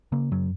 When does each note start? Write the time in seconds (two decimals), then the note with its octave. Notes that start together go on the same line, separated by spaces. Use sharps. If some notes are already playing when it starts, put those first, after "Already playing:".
0.12 C#3 A#3
0.31 F#2 F#3